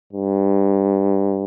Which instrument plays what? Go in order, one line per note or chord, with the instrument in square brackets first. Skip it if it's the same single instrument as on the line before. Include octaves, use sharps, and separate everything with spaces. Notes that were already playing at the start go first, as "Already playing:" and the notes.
[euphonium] G2